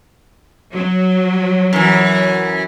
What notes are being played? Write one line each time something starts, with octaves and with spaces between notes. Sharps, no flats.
F#3
F#2 E3